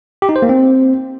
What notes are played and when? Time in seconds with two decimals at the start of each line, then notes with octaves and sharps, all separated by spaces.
0.22 G4
0.29 D#4
0.36 C5
0.42 A#3
0.49 C4